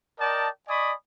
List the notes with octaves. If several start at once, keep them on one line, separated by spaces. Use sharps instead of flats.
A#4 D5 D#5 G5 A5
D5 D#5 G#5 B5 C#6 D#6